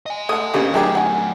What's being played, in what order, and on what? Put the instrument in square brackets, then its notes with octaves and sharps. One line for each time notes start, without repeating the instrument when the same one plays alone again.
[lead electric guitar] D#5 G#5
[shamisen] A3 A5 [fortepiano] F#5 D#6
[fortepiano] D2 C#3 A#3 [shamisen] C4 G4 A4
[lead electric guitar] F#3 A3 [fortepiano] D4 G4 G#4 [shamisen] D#4 A#4 G5
[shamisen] F#5 G#5